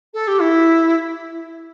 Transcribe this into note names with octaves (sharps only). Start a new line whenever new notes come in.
A4
G4
E4